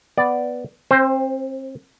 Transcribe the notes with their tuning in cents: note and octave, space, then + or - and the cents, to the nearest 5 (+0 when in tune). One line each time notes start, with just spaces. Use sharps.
B3 +0 D5 +0
C4 +30 C5 +0